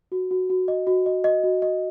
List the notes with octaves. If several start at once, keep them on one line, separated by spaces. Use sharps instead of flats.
F#4
F#4
F#4
D#5
F#4
D#5
D#5
F#4
D#5